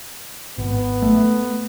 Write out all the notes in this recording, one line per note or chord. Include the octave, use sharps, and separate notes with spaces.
G#1 B3
A3